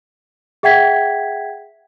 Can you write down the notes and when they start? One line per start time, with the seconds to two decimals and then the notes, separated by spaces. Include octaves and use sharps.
0.63 G#4 E5 F#5 G5 G#6 B6